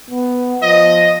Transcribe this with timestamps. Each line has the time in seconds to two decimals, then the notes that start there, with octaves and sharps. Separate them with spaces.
0.11 B3
0.63 F3 D#5